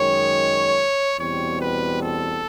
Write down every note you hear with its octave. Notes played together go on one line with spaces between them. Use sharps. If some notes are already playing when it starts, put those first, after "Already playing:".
Already playing: F#2 D#3 G#3 C#5
E2 B2 G3 C4 C#5
B4
A4